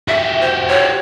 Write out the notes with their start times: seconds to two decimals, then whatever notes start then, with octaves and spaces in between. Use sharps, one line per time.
0.08 F#4 G4 E5
0.41 C5
0.68 C#5